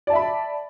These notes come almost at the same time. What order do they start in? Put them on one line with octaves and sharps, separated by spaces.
D5 A5 E5 B5